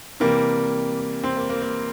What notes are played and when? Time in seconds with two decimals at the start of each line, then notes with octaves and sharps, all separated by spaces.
0.20 C3 E3 G3 A#3
1.24 C4
1.36 A#3
1.49 A#3
1.62 A#3